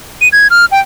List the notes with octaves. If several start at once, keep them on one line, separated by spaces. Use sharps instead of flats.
D#7
G#6
F6
G5